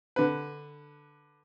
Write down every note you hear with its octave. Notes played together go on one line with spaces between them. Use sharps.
D3 B4